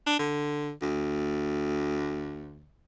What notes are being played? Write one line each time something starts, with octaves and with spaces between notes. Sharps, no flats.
D4
D3
D2